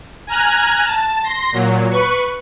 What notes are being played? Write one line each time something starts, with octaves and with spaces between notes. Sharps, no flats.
G#5 A#5 F6 F#6 G#6
A5
C6 A#6
A#2 F#3
B4 C#6